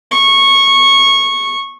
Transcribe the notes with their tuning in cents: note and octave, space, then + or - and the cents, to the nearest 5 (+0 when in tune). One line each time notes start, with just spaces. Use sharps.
C#6 -15